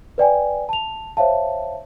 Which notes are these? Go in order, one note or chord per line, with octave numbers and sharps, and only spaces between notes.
B4 D5 G5 G#5
A5 F7
C5 C#5 E5 F5 A5